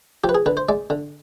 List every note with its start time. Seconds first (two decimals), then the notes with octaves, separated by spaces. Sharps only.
0.24 F3 G4
0.29 B4
0.35 G#4
0.46 D3 B4
0.57 C5
0.69 G#3 D5
0.90 D3